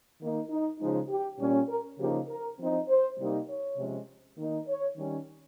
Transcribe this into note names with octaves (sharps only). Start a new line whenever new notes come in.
D#3 A#3 D#4
D#4
C#3 F3 G#3 D#4
G4
A#2 G3 C#4
A#4
C#3 F3 A#3 D#4 G4
A#4
F3 C4 D#4
C5
C3 G3 A#3 D#4
C#5
C3 F3 G#3 C#4
D#3 A#3 D#4
C#5
D#3 G3 C#4